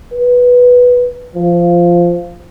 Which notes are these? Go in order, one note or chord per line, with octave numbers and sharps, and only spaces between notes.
B4
F3